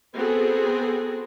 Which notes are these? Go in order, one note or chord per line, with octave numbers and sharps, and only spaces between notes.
B3 C4 F#4 G#4 A4